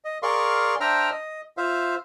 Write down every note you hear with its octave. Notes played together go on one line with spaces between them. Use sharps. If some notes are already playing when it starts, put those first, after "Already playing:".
D#5
G#4 A#4 D5 F5 C6 C#6
D4 C5 E5 G5 A#5 F6
D#5
F4 C5 E5 F5